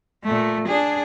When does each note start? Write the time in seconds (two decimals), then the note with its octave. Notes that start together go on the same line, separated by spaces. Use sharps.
0.24 A#2 A3
0.67 D4 G#4